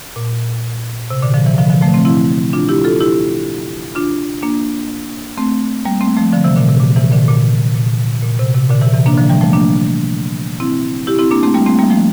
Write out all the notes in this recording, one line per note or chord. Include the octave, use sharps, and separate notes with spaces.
A#2
C3
A#2 D3
D3 F3
C3 E3
D3 F3
D3 F3
F3 A3
A3 C4
C4 E4
D4 F4
E4 G4
F4 A4
E4 G4
D4 F4
A#3 D4
A3 C4
G3 A#3
A3 C4
F3 A3
D3 F3
C3 E3
A#2 D3
C3
A#2
C3 E3
A#2 D3
A#2
A#2
A#2
C3
C3
A#2 D3
C3 E3
C3 E3
A#3 D4
D3 F3
E3 G3
F3 A3
A#3 D4
C4 E4
E4 G4
C4 E4
A#3 D4
A3 C4
G3 A#3
A3 C4
G3 A#3
F3 A3